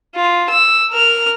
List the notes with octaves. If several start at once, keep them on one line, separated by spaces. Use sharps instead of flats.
F4
E6
A#4 F6